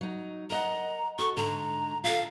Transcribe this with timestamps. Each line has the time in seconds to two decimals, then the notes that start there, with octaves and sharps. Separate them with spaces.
0.01 F#3 D#4
0.50 A#4 D#5 F#5 A#5
1.19 F#4 A4 C#6
1.37 G#2 D3 A#5
2.04 F4 G4 A4 F5